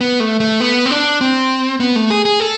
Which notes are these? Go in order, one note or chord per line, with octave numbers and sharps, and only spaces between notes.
B3
A3
A3
B3
C4
D4
C4
B3
A3
G#4
G#4
A4